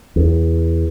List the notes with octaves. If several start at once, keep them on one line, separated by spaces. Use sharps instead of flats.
E2